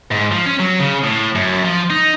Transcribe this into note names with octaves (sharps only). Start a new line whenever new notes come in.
G#2
F3
C#4
F#3
C#3
A2
F#2
F3
D#4